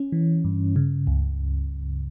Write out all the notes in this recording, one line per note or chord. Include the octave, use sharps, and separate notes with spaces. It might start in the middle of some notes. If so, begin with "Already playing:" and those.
Already playing: C#4
E3
G2
C#3
C#2